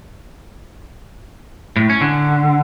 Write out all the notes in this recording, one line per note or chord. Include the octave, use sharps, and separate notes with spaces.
A2
C#4
D3